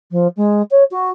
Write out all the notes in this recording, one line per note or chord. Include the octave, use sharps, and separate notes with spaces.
F3
G#3
C#5
F#4